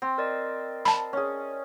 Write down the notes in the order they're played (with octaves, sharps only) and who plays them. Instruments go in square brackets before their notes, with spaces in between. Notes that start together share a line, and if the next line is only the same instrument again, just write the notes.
[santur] C4
[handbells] A#4 D5 D#5
[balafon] A5 B5
[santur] C#4 G#4